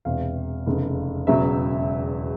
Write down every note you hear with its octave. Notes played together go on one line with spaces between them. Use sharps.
E1 E2 C3 F5
F1 E2 C#3
E1 E2 C#3 F#3 E5